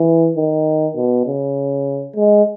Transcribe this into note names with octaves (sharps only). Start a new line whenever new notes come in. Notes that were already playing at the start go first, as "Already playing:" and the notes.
Already playing: E3
D#3
B2
C#3
G#3